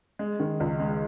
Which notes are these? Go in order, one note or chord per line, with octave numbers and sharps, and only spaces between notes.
G#3
D#3
C#2
G#3